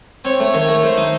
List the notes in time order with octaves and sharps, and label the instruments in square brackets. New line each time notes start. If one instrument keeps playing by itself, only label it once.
[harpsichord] C4 [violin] C#5
[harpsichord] A3
D#3
A3
[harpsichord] A3 [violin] C5
[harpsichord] D#4